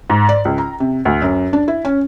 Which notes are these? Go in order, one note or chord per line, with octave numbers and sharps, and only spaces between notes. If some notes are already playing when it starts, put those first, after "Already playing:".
G#2
D5
C#2
A#5
C3
D2
F#2
D4
E4
C#4